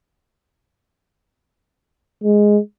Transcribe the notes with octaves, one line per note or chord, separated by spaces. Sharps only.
G#3